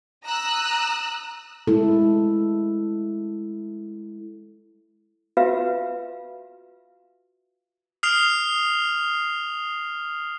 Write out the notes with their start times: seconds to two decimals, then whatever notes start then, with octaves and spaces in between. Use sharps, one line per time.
0.25 A#5 D#6 E6 F#6
1.67 G#3 E4 A4
5.37 F4 F#4 B4 E5 F5
8.03 D#6 F6 C7 F7